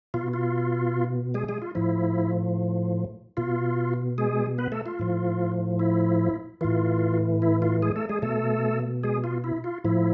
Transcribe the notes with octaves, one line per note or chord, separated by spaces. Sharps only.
B2 F4
F4
G#3 G#4
G#3 G#4
F4
A2 F3 E4
B2 F4
G#3 G#4
B3 B4
A3 A4
F4
A2 F3
E4
A2 E3 F4
E4
F4
G#3 G#4
A3 A4
G#3 G#4
B2 A3 A4
G#3 G#4
F4
E4
F4
A2 F3 E4